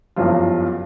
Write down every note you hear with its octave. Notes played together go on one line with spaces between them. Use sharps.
F#1 E2 G2 F3 F#3 F4